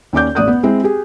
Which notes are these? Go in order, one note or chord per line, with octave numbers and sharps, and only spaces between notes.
D#2 C#4 D5 D6 G6
A1 D5 D#6 F#6 G6
B3
G#3 C4 E4
G4 G#4